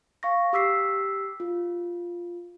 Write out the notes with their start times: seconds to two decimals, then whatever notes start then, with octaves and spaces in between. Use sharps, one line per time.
0.23 F5 C#6 A#6
0.53 G4 D6 E6 B6 C7
1.40 F4